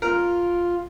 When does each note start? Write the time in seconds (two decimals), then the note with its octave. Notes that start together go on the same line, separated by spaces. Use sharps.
0.02 F4 A#4